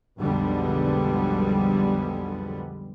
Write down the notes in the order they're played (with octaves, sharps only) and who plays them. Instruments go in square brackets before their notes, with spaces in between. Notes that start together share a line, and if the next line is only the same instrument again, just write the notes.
[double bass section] B1 F2 D3 G3 G#3 B3